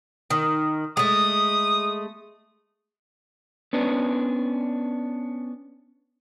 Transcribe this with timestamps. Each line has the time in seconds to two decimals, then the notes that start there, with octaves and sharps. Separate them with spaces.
0.30 D#3
0.97 G#3 A3 D#6
3.73 B3 C#4 D4